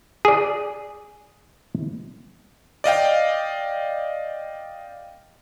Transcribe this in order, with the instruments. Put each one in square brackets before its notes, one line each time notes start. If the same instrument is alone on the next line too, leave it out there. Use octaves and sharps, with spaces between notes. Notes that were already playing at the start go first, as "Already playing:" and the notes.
[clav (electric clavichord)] G#4 D5
[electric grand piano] D5 D#5 F5 G5